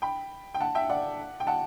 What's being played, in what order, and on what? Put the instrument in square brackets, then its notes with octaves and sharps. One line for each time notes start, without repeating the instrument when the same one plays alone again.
[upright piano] G5 B5
G5
F#5 A5
E5 G5
D5 F#5
G5
F#5 A5